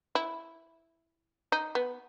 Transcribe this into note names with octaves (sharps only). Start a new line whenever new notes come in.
E4
D#4
B3